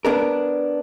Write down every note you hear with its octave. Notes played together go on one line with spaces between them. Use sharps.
B3 D4 A#4